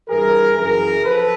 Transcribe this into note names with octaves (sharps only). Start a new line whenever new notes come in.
G2 E3 G#4 A#4
F#2 C#3 E3 G#4 A#4
F3 A4 B4